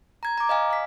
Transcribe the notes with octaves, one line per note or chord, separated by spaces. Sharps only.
A#5 G#6
A#5 D6
D#5 F5 G#5
F5 B6